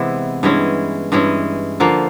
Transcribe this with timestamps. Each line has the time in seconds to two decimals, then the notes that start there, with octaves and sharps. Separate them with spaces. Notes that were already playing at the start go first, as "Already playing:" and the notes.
Already playing: C3 E3 G#3 B3
0.43 G2 E3 G#3 C#4
1.12 G2 E3 G#3 C#4
1.80 D3 F3 A#3